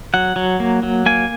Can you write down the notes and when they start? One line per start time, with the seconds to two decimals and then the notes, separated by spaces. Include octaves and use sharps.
0.14 F#3 F#5
0.36 F#3
0.60 A#3
0.83 F#3
1.06 A#3 G#5